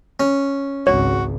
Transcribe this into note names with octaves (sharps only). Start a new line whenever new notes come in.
C#4
G#1 C#2 F#4 C#5